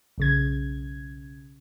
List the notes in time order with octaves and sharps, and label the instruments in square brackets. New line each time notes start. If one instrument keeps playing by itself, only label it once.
[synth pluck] B1 C#3 G#6